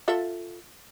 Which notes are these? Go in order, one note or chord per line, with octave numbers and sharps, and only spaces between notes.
F4 A4 E5